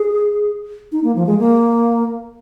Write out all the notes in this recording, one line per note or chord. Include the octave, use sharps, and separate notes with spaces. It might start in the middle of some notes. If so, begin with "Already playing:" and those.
Already playing: G#4
D#4
A#3
F3
G#3
A#3